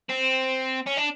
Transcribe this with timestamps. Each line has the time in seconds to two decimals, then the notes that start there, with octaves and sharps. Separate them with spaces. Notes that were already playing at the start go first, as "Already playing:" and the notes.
0.09 C4
0.87 C#4
0.97 D4